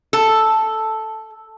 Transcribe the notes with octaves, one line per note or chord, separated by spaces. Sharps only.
A4